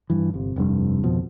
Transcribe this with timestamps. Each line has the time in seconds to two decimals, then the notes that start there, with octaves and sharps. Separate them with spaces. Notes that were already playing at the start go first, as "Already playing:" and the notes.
0.10 G2 E3
0.34 G1 C3
0.56 F1 C2 G2
1.04 G#1 F2 B2 F3